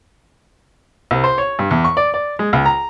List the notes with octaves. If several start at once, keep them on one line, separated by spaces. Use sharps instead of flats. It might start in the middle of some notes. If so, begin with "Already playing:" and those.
C2
C5
C#5
G2
E2
C#6
D5
D5
G#3
C#2
A#5